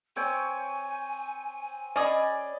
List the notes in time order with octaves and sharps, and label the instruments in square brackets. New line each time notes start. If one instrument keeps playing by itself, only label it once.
[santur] C4 C#5 G5 [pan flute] G#5
[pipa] C#4 G#4 [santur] D5 D#5 B5